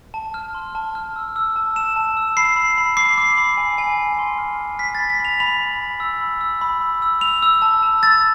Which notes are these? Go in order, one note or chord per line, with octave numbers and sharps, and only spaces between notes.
A5
F6
C6
A5
F6
E6
E6
A5
A5 E7
A5
E6
B5 C7
B5
B5
D6 C7
D6
B5
G#5
G#5
G#5
C6
F6
G#5
F6 B6
A6
B5
B6
B5
F7
B5 F7
B5
B5
E6
B5
E6
B5
E6
E6
E6 F7
E6
A5
A5
E6 A6